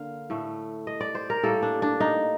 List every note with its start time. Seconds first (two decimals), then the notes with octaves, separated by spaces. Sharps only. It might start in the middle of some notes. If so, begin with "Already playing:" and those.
Already playing: D3 A#3 F5
0.30 A2 A3
0.87 D#5
1.01 D5
1.15 C5
1.30 A#4
1.43 A2 G3 A#3 A4
1.63 D4
1.82 D4
2.00 D#4